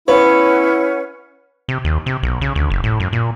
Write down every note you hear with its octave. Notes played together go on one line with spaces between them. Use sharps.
B3 C#4 E4 B4 C#5 F#5
C3
D#2
C3
B1
C#3
D2
F#1
A2
F#2
A#2